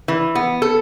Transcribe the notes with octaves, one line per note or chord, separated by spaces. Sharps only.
E3
B3
A4